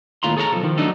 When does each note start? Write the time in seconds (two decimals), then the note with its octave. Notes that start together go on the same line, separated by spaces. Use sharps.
0.23 D#2 A2 F4 A#5 C6
0.37 G#4 A4 C#5 E5 A#5
0.52 B1 F3 A4
0.63 D#3 F3
0.78 F#3 A3 D4 D#4 A4